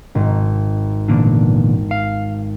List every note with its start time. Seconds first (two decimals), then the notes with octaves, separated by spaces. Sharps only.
0.15 G#1
1.08 E2 A#2 D3
1.91 F5